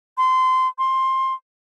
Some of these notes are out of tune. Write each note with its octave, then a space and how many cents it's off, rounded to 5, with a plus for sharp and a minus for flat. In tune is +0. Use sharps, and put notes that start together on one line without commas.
C6 -20
C6 +15